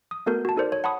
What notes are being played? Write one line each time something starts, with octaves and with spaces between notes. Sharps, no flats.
D#6
A3 B3 F#4 A4 A#4 G6
F#4 A5
D#4 A4 A#4 C5 D5
C#5
F#5 A5 B5 C#6 D#6